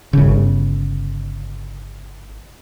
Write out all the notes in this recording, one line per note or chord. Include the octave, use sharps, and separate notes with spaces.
G1 C#3